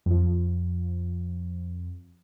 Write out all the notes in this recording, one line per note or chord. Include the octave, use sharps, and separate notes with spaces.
F2 F3